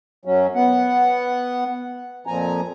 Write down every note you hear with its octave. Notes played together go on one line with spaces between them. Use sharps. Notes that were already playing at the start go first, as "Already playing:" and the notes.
F#2 F#3 C#4
B3 F#5
F2 A#2 F3 G#5 A#5